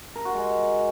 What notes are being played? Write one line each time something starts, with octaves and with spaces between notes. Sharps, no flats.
A#4
F#4
G#3